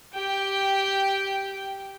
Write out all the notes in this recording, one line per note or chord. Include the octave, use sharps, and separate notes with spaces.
G4 G5